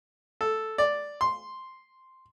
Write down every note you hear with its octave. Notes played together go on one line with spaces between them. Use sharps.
A4
D5
C6